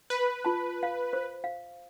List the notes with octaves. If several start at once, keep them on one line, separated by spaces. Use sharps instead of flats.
B4
F4 A5
F5
C5
F5